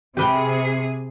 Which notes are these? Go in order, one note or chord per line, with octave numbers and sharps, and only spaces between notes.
C3 G4 G#4 B4 G5